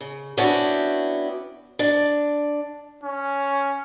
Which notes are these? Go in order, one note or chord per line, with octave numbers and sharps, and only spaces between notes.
C#3
B3 C#4 D4 E4 F#4 G5
D4
C#4